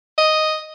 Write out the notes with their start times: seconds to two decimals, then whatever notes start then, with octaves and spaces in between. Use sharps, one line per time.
0.18 D#5